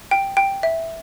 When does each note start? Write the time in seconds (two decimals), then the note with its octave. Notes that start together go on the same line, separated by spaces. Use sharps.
0.11 G5
0.37 G5
0.63 E5